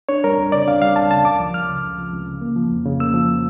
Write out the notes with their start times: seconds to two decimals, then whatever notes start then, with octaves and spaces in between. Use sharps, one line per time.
0.09 D4 C#5
0.24 G3 A#4
0.38 D2
0.52 C#3 D5
0.67 D4 F5
0.82 G3 F5
0.96 D2 A5
1.11 C#3 A5
1.25 C#2 D6
1.40 F3
1.54 C#2 F6
1.69 C#3
1.84 C#2
1.98 F3
2.13 C#2
2.27 C#3
2.42 A#3
2.56 F3
2.70 F2
2.85 C#3
3.00 A#3 E6
3.14 F3